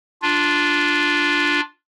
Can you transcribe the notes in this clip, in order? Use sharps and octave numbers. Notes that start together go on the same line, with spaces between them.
D4 F4